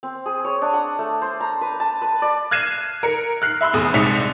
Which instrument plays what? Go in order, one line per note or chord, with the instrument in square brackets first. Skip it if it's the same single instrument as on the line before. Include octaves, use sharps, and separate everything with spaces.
[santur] C4
G#4
C#5
D4
F#5
A3
C5
A#5
B4
A5
B4
D5
[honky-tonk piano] F6 F#6 G#6 C7 D#7 E7
A#4 C#7
F6 F#6 C7
E5 B5 C6 E6
F1 E2 G#4 D#6
C2 G#2 C4 B6 C#7 F7